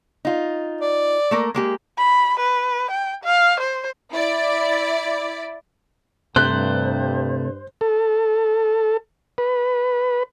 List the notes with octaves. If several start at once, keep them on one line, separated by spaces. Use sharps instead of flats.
D#4 F4
D5
A3 A#3 A#4
G#3 A#3 G4
B5
B4
G5
F5
C5
E4 D5
G2 C3 A3 C5 F#6
A4
B4